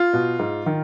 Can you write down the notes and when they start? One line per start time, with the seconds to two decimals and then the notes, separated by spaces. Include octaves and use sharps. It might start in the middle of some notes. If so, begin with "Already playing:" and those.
Already playing: F4
0.13 B2
0.39 G#2
0.66 D#3